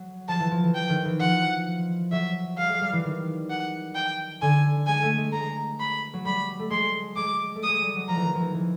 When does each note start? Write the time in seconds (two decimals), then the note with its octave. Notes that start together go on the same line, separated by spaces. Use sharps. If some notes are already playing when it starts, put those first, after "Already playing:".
Already playing: F#3
0.28 F3 A5
0.40 E3
0.51 F3
0.63 E3
0.75 G5
0.89 D#3
1.05 E3
1.20 F3 F#5
2.12 F#3 E5
2.58 G3 F5
2.69 G#3
2.81 G3
2.93 E3
3.05 D#3
3.50 F#5
3.95 G5
4.42 D3 G#5
4.87 G#3 G#5
5.03 A3
5.17 G#3
5.33 G#3 A#5
5.80 B5
6.14 F#3
6.25 G3 B5
6.59 A3
6.71 G#3 C6
7.16 G#3 D6
7.56 A3
7.63 D#6
7.69 G#3
7.82 G3
7.96 F#3
8.09 F3 A#5
8.16 E3
8.24 D#3
8.35 E3 F3
8.54 E3